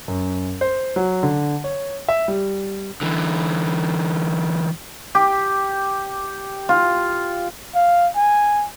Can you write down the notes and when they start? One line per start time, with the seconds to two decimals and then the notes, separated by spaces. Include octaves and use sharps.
0.08 F#2
0.61 C5
0.96 F#3
1.23 D3
1.64 C#5
2.08 E5
2.28 G3
3.01 D3 E3
5.15 G4
6.69 F4
7.75 F5
8.16 G#5